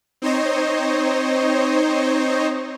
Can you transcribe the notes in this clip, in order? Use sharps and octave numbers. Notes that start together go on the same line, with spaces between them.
C4 D#4 C5 C#5 D#5